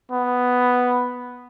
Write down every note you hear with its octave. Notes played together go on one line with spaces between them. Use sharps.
B3